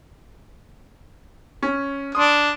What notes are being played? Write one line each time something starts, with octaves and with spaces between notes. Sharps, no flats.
C#4
D4 C6 D#6